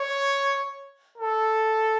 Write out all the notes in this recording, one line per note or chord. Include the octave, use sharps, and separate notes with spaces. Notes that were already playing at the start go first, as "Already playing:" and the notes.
Already playing: C#5
A4